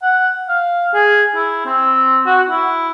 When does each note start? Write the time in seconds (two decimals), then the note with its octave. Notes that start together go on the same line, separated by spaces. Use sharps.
0.02 F#5
0.49 F5
0.94 G#4
1.36 E4
1.66 C4
2.26 F#4
2.50 E4